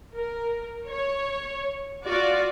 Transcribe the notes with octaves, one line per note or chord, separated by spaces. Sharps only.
A#4
C#5
F4 F#4 D5